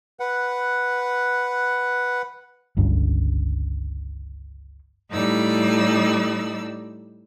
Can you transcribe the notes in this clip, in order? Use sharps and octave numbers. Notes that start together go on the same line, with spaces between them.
B4 F#5
G1 C#2 G2 C#3
A2 G3 D#4 D5 E6